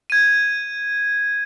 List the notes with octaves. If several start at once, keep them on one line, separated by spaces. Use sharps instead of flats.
G#6 D#7